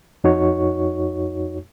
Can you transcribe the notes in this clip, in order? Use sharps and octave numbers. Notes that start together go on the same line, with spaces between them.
F2 D#4 F#4 C#5 C#6